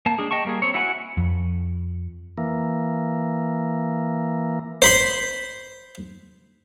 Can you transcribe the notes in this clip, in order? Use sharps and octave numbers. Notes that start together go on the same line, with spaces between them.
A#3 A5
G#3 D4 G#4
D#5 G5 A5 C#6
G3 A#3 G#4
C4 C#5
E4 F#4 F#5 G#5 B5
F2
E3 A#3
C5 B5 C6